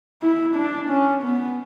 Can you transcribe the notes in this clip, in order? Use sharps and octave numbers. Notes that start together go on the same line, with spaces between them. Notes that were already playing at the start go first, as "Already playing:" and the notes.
E4
D4
C#4
B3